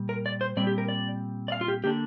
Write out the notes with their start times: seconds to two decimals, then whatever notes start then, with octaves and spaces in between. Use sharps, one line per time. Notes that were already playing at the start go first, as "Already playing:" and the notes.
Already playing: A#2 G3
0.09 A#4
0.26 D5
0.41 C5
0.57 A#2 G3 C4 D5
0.67 G4
0.78 A#4
0.88 D5
1.48 D5
1.52 F5
1.61 F4
1.68 G4
1.84 D3 A#3 D4 G4